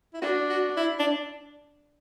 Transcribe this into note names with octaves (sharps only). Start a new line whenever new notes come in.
E4
D4 F#4
F#4
E4
D4